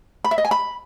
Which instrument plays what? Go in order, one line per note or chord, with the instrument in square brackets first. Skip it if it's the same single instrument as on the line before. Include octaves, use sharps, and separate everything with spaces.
[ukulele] B5
E5
D#5
G#5
B5